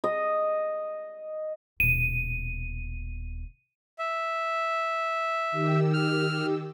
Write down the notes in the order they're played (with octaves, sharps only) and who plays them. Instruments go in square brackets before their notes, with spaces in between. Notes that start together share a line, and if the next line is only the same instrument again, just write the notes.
[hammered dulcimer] D#5
[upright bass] D#1 B2 [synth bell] D#7
[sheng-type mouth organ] E5
[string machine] D#3 G4 E6
[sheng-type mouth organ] F6